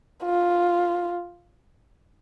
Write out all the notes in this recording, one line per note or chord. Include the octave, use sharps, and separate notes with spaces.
F4